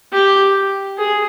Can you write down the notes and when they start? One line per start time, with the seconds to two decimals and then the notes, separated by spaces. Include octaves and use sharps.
0.13 G4
0.98 G#4